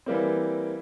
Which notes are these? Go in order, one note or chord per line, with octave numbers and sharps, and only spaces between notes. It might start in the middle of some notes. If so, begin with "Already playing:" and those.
E3 G3 A#3 C4